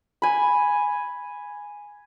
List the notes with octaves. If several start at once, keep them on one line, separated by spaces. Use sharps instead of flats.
G#5 B5